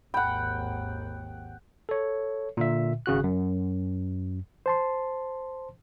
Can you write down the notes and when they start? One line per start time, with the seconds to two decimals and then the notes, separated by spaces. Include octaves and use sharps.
0.14 G#1 D#2 F#5 G5 B5
1.89 A4 C#5
2.57 A#2 D3 E5
3.06 G#1 C#3 F#4 F#6
3.24 F#2
4.66 C5 A5 C6